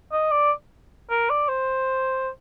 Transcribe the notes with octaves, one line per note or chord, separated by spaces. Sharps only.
D#5
D5
A#4
D5
C5